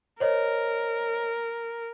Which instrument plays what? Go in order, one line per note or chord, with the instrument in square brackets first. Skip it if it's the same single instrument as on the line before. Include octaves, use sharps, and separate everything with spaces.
[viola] A#4 [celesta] C5 C#5 D#5